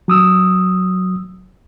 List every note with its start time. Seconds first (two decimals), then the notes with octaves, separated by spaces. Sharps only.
0.08 F#3 D#6 E6